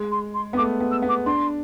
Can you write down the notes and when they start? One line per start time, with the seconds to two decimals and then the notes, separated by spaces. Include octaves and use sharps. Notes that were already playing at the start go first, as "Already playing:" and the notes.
Already playing: G#3
0.12 C6
0.34 C6
0.53 B3
0.57 A3 D6
0.80 B3
0.91 E6
1.02 B3
1.09 D6
1.26 D4 C6